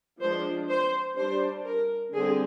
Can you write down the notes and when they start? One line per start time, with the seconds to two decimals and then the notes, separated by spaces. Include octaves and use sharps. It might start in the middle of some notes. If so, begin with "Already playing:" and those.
0.21 F3 G#3 D4 C5
0.69 C5
1.16 G3 D4 C5
1.66 A#4
2.12 D3 G3 C4 G#4